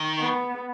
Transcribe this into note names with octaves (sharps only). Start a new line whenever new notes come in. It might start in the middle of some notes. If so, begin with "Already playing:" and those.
Already playing: D#3
B3